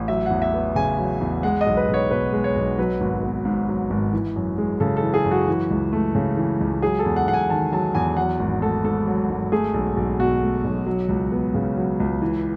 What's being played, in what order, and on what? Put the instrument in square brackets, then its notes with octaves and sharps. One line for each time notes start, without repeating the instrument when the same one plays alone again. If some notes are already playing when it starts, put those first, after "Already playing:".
Already playing: [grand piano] A1
F#3 E5
E2 F#5
E5
B3
C#3 G#5
F#3
E2
G#3 F#5
D#5
B1
B4
B1
C#5
B2 B4
G#3
C#5
B1
F#3 B4
G#1
B3
G#2
F#3
G#1
E3
F#2
G#3
C#3 A4
A4
E3
G#4
F#2
F#4
E3
C#2
A3
C#3
E3
C#2
F#3 G#4
A4
E2
F#5
E2 F#5
G#5
D#3 A5
F#3 A5
E2 G#5
F#3 F#5
G#1
A3 A4
G#2 A4
F#3
G#1
A3 G#4
B1
B1
B2 F#4
A3
B1
F#3
C#2
B3
C#3
F#3
C#2
E3